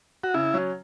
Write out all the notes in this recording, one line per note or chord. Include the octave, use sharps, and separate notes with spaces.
F#4
C#3 E4
F#3 C#4